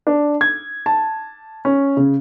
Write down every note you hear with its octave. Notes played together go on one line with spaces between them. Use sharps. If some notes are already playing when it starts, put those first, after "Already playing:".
D4
G#6
A5
C#4
C#3